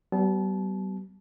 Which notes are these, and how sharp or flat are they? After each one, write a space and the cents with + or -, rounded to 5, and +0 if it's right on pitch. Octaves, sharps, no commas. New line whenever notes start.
G3 -40 B3 +10 A5 -30